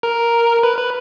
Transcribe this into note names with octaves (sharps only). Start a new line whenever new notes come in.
A#4
B4
B4